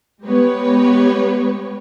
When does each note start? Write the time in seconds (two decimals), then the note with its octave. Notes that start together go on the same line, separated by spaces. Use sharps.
0.23 G#3 B3 G4 B4 C#5